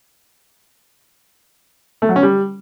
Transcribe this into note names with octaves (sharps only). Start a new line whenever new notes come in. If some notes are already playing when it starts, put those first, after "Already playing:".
A3
F#3
C#4
G3